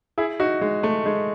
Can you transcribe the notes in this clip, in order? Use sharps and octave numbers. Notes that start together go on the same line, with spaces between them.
E4 G#4
D#4 F#4
G#3
A3
G#3